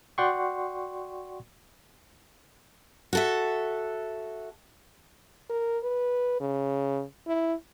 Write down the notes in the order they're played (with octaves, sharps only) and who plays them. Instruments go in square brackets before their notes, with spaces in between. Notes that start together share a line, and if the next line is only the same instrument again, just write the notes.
[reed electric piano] F#4 D5 F#5 G5 C6 C#6
[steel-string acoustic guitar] F#4 A4 E5
[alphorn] A#4
B4
C#3
E4